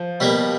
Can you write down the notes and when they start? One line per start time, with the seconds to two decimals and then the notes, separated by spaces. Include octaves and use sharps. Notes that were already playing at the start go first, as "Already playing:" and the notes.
Already playing: F3
0.20 B2 G3 A#3